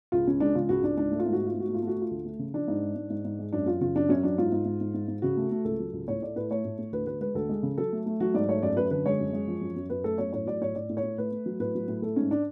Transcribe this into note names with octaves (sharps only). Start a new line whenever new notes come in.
C#2 F4
C#2 C#4
G#3 D4
C#3 F4
C#2 F#4
C#2 D4
G#2 D4
A3
F4
G#2
F#4
A3
F4
G#2
F#4
A3
F4
A3 F#4
A3 F4
D2
A3
C#3
F3 D4
G#2
G#3
G#2
G#2
G#2
G#3
F#2 D4
F#2 F4
C#3 F4
F#2 D4
F#2 C#4
F#3 D4
G#2 F4
G#2
G#2
G#2
G#2
G#2
C#3 F#4
A3
A3
C#2 A4
F#3
C#2
A2 C#5
A3 D5
A2 B4
A3 C#5
A2
A2
D2 B4
D2 B4
G#3 B4
D2 A4
G#3
C#3
F#3 A4
A3
A3
F#3 F#4
G#2 D5
A3 C#5
F#2 D5
F#2 B4
D3 B4
G#3 C#5
F#2
G#3
F3
F#2
F#2
F#2 B4
A3 A4
F#2 C#5
A2 C#5
F#3 D5
A2 C#5
A2 D5
A2
C#5
A2
A3 B4
A3
F#3
A2 B4
F#3
A2
A3 A4
G#2 C#4
D4